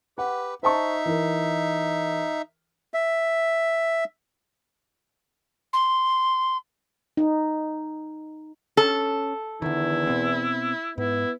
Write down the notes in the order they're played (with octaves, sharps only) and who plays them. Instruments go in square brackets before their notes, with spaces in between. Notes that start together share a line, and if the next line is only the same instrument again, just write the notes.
[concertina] G4 B4 [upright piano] F#5
[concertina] D#4 E5 [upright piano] C5 A5 C#6
[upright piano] E3 A#4
[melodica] E5
[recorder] C6
[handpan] D#4
[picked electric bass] C#4 [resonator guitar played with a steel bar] A4
[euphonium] E2 [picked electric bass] D3 D#3 [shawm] E4
[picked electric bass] B2 B3 C4
[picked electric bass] G#2 [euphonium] B3 [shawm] E4